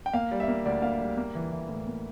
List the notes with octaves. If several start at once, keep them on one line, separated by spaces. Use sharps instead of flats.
G5
A#3 F5
G3
E5
A#3
D2 D5
A#3 F5
G3
A#3
E3
E3
A2
A#3